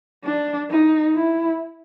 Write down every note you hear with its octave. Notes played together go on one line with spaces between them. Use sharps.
D4
D#4
E4